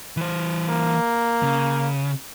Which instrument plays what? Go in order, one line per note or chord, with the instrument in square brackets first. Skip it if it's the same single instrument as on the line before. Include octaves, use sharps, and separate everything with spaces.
[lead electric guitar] E3 C5
[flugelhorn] A#3
[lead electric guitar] C#3